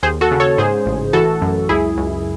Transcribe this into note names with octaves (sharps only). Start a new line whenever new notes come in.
D#2 G#4 C5
F#4 A4
C#3
A4 C#5
G#2 G#4 C5
A1
E3 F#4 A4
F#2
C#2 E4 G#4
C#2